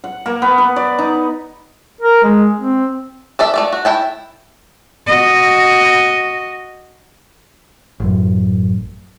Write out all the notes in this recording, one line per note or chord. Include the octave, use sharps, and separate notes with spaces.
F#5
A#3
B3
B4
D5
D#4
A#4
G#3
C4
A4 D5 E5
A3 C4 D5
F#4
E4 G5 A5
F#4 D#5
A1 F#2